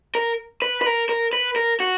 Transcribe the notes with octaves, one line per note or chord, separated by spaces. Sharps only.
A#4
B4
B4
A#4
A#4
B4
A#4
F#4